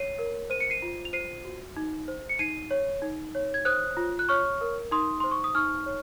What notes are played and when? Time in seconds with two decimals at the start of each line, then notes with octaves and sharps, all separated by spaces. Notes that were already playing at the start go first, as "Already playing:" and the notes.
Already playing: C#5 C7 D#7
0.19 A#4
0.50 C5 D#7
0.60 C#7
0.70 C7 D#7
0.82 F4
1.05 F7
1.13 C5 C7 D#7
1.45 F#4
1.77 D#4
2.08 C5
2.29 C#7
2.39 D#4 C7 D#7
2.71 C#5
3.02 D#4
3.35 C#5
3.54 G#6
3.65 C5 D#6 F#6
3.97 F4
4.19 F#6
4.29 C#5 C#6 F6
4.61 A#4
4.91 D#4 C6 D#6
5.20 C5 C6
5.31 C#6
5.44 D#6
5.55 D#4 C#6 F6
5.86 C#5